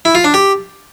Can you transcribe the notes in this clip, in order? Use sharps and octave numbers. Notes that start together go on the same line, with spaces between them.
E4
F4
D4
G4